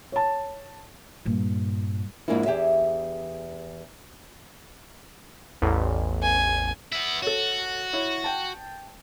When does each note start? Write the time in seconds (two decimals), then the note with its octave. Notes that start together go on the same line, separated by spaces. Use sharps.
0.12 C#5 A5
1.25 G2 A#2
2.28 F2 G#2 G#3 A#3 D4 E4
2.46 E2 G4 G#4 E5
5.62 A1 E2
6.22 G#5
6.92 B3 E4
7.22 F#4 A4 C#5
7.93 E4 C#5
8.24 G5 A5